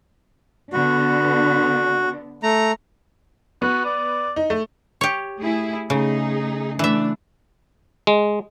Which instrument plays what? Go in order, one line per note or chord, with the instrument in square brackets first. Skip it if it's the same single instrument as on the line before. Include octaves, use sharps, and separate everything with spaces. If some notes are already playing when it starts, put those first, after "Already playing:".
[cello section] D3 B3 D4 [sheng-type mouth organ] F#4
[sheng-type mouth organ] A3 A#5
[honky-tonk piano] B3 [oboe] F#4
[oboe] D5
[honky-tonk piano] D#4
A3
[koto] G4 C#5
[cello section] A3 E4 G#4
[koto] C#3 [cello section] A3 D#4 G#4
[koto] E3 E5 [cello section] A3 D4
[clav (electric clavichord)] G#3